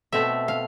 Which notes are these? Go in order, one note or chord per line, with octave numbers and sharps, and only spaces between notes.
B2 A3 C4 E5
F5